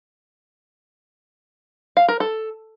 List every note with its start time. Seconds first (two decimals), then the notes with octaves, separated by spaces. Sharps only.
1.97 F5
2.08 A#4
2.20 A4